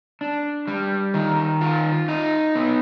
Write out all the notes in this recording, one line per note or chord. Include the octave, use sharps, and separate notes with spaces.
D4
G3
D#3
F4
D#4
B3